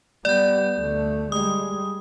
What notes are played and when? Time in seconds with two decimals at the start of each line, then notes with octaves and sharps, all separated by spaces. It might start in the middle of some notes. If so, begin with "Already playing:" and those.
0.25 G3 B3 D5 G6
0.80 D2 A3
1.32 G3 G#3 D#6